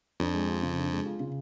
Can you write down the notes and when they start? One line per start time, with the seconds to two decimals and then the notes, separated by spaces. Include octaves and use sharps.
0.20 F2 D4
0.34 G#3
0.49 F4
0.63 C#3
0.78 D4
0.92 G#3
1.05 F4
1.20 C#3